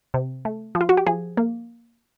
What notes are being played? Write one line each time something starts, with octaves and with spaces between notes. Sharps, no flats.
C3
A3
F3
F4
F#4
G4
F3 G#4
A#3